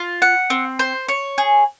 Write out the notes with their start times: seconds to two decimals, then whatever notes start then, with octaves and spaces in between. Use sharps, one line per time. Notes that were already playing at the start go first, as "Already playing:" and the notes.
Already playing: F4
0.22 F#5
0.50 C4
0.79 C5
1.08 C#5
1.38 G#4